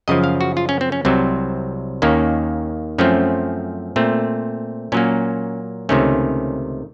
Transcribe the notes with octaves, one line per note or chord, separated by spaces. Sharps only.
F#2 C#3 F3 D#5
F5
F#4
F4
C#4
C4
C#4
C2 C3 F#3 C4
D#2 D#3 A#3 C#4
F#2 F3 A3 C4 C#4
A#2 A3 C4
A#2 F#3 A#3 C#4
C#2 C3 D#3 A3 C#4